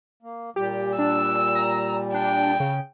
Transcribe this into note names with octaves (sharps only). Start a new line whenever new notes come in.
A#3
A#2 G3 G4
D4 E6
A#5
D4 G5
C#3